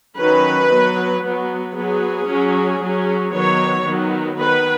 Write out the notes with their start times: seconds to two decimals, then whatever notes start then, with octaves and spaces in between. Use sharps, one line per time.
0.17 D#3 F#3 C#4 B4
0.70 F#3 B3
1.22 F#3 B3
1.75 F#3 B3 G#4
2.27 F#3 C#4
2.81 F#3 C#4
3.33 D#3 F#3 B3 C#5
3.86 D#3 F#3 B3
4.39 D#3 B3 B4